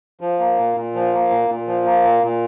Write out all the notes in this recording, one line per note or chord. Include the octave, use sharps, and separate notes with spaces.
F3
A#3
A#2
A#2
F3
A#3
A#2
A#2
F3
A#3
A#2
A#2